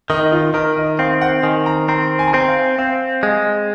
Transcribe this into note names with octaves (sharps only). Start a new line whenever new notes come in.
D#3 D#4
F4
D#3 A#4
D#5
C4 F5
F#5
D#3 G#5
A#5
C4 A#5
G#5
A#5
C4 G#5
F5
C4 F5
G#3